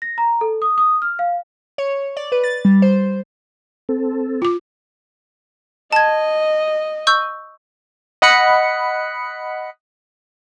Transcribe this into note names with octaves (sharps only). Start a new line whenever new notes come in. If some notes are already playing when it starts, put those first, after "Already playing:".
A#6
A#5
A4
D#6
D#6
F6
F5
C#5
D5
B4
A6
G3
C5
C4 A4
F4 D6
D#5 A5 G#6
C#6 E6 G6
D#5 F#5 B5 C#7